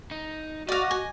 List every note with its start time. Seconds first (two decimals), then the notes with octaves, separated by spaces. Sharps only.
0.11 D#4
0.68 F#4 D5 D#5 F5
0.91 G#5